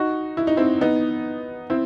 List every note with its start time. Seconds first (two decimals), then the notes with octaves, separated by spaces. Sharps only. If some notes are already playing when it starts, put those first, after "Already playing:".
Already playing: D#4 F#4
0.37 E4
0.47 D#4
0.57 C4 E4
0.81 B3 D#4
1.70 C4 E4